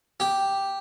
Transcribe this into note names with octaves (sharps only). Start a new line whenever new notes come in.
G4